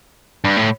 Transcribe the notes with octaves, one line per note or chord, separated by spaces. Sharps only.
G2
A2